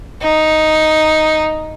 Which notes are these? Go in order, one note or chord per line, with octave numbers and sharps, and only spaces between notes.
D#4